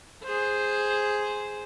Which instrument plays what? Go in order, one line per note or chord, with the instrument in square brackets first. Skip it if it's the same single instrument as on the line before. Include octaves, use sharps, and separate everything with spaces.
[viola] G#4 C5